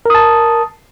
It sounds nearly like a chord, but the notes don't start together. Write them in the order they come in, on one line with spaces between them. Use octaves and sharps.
A#4 D#6 A5